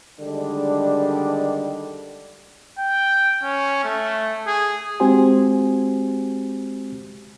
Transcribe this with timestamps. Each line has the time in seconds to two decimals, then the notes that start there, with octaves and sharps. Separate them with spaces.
0.19 D3 D#3 G3 G#3 D4
2.78 G5
3.43 C#4
3.84 A3
4.47 G#4
5.00 G#3 C4 F#4 G4 C5 G#5